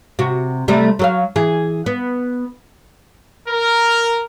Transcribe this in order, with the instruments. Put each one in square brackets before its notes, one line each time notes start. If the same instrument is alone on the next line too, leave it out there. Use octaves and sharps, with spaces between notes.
[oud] C3 F#4
C3 G3 A3
F#3 A4 F5
E3 G#4
B3
[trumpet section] A#4